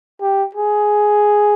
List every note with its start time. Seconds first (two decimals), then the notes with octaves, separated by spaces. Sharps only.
0.21 G4
0.55 G#4